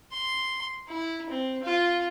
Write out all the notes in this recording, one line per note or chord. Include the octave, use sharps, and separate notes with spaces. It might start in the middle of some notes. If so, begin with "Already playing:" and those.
C6
E4
C4
F4